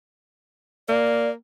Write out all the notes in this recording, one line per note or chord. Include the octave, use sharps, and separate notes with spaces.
A#3 D5